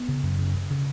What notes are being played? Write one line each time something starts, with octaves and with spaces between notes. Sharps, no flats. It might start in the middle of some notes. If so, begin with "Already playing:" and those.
Already playing: B3
C#3
F#2
C#3
C#3
C#3